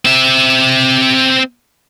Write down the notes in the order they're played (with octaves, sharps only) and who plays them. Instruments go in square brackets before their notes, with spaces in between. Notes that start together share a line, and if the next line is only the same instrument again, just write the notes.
[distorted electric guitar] C4 E5